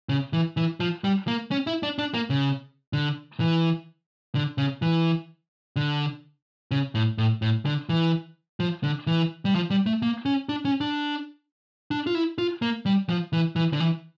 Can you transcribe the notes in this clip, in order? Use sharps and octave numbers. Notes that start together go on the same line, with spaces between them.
C#3
E3
E3
F3
G3
A#3
C#4
E4
D4
D4
A#3
C#3
D3
E3
D3
C#3
E3
D3
C#3
A2
A2
A2
D3
E3
F3
D3
E3
G3
F3
G3
A3
A#3
C#4
D4
C#4
D4
D4
F4
E4
F4
A#3
G3
F3
E3
E3
D3
E3